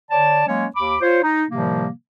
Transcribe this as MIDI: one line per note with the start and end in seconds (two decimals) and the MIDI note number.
0.11 0.44 50
0.11 0.44 73
0.11 0.44 74
0.11 0.44 81
0.47 0.66 54
0.47 0.66 56
0.47 0.66 58
0.47 0.66 61
0.47 0.66 73
0.76 0.97 39
0.76 0.97 83
0.76 0.97 86
1.02 1.22 65
1.02 1.22 72
1.02 1.22 73
1.23 1.43 63
1.50 1.89 45
1.50 1.89 48
1.50 1.89 51
1.50 1.89 53
1.50 1.89 55
1.50 1.89 58